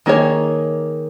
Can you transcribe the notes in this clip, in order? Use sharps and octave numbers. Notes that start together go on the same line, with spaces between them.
D#3 A#3 D#4 G#4 C#5